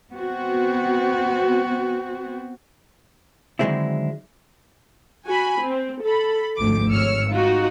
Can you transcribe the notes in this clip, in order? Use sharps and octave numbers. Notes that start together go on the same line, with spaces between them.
B3 C4 F#4
D3 D#3 F#3 G#3 C4 E4
F#4 G#5 B5
C4
A4 B5
G#1 D2 F3 D6
G#1 C#5 E6 F6 C#7
D#4 F4 F#4